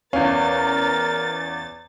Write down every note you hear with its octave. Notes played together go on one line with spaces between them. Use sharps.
E2 C#4 A#4 F5 A6